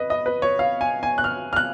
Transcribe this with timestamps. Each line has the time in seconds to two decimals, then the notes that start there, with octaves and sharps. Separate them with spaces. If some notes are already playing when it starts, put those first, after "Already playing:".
Already playing: B4 D#5
0.10 D#5
0.26 B4
0.42 C#5
0.59 F5
0.81 G#5
1.03 G#5
1.18 F#6
1.24 F6
1.53 F6
1.56 F#6